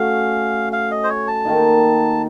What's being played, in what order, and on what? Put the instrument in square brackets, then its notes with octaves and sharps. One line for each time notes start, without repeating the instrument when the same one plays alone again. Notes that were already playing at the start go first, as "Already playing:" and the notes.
Already playing: [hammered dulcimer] A3 C#4 F#4 [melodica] F5
[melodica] F5
D#5
C5
C#5
A5
[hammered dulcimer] D#3 A#3 D#4